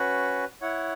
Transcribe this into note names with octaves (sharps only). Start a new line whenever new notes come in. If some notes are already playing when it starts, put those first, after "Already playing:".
Already playing: C#4 F#4 B4
E4 C#5 F#5